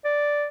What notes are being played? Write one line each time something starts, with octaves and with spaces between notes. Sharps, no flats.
D5